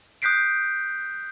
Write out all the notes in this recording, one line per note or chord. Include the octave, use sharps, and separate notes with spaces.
D#6 F#6 G6 B6 C7 D7